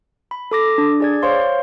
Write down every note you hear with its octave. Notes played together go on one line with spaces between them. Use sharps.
B5
A4 D6 A#6
D4
G#4 D5 G#6
C5 C#5 F5 C6